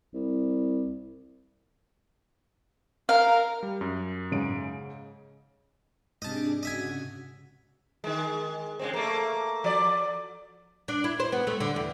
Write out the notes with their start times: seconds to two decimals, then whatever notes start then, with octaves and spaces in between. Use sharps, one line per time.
0.14 C2
3.09 A#4 F5
3.63 G3
3.81 F#2
4.31 G#2 C#3 D7
6.22 G#2 C3 D4 G#4 D#5 A5 D6
6.63 C#3 F#4 D#5 E5 G#5
8.04 D#3 G#3
8.79 C#3 G#3 C4
8.94 A3 A#3
9.64 F3 D5
10.88 D4
11.04 E4
11.20 C5
11.32 B3
11.47 A3
11.60 D3
11.76 E2